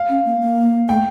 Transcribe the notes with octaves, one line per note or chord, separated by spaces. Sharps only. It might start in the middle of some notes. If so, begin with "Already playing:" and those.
Already playing: F5
C#4
A#3
A#3
A3 G5